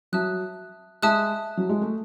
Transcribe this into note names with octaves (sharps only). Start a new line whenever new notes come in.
F#3 E5 A5 D#6 F#6
G#3 E5 A5 D#6 F#6
F#3
G#3
A3